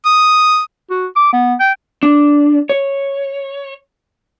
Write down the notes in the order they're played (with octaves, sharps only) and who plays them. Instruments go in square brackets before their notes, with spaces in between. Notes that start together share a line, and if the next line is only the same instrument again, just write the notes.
[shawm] D#6
[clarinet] F#4
D6
B3
G5
[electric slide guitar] D4
C#5